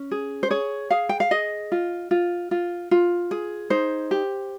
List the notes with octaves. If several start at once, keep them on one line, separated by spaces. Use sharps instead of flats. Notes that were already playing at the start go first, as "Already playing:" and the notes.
Already playing: C#4
G#4
C5
G#4 C#5
G#4 F5
G5
F5
G#4 D#5
F4
F4
F4
F4
G#4
D#4 C5
G4